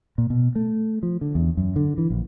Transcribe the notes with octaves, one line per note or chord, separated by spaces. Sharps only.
A#2
B2
A3
F3
D3
E2
F#2
D3
E3
A#1